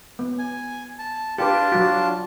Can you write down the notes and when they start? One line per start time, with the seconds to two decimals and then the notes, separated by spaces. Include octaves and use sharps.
0.19 B3
0.39 G#5
0.99 A5
1.38 D4 F4 G4 B4 A5
1.72 F#3 F#4